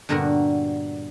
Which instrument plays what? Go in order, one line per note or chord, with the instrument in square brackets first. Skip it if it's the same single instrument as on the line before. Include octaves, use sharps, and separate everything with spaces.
[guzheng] G2 A#2 D3 B3 F#4 A#4